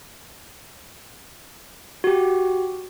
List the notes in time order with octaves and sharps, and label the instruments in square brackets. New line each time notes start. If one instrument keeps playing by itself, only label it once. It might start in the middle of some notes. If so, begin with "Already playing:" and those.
[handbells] F#4 G4